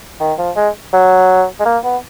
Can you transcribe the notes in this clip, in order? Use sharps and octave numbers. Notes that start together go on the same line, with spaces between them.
D#3
F3
G#3
F#3
G#3
A#3
B3